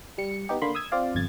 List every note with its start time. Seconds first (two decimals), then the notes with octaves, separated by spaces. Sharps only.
0.18 G3 C#7
0.49 B3 D#4 G4
0.62 D3 A#3 B5 C6
0.75 D#6 E6 G#6
0.92 C4 F4 D5 F5
1.15 G1 F2 G#6 A6